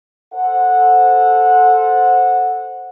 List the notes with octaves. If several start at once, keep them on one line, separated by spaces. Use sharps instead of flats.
A4 C5 F#5